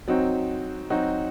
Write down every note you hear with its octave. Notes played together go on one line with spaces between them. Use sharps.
F#3 C4 D#4 F#4
F#3 C4 D#4 F#4